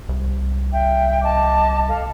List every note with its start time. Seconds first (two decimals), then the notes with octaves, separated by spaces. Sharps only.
0.09 C2
0.71 E5 G5
1.22 D#5 A5 D6
1.87 A4 F5